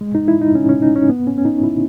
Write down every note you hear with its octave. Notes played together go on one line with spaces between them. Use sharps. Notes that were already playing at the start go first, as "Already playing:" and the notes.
G#3
D#4
E4
D#4
C#4
C#4
D#4
C#4
B3
C#4
C#4
D#4
E4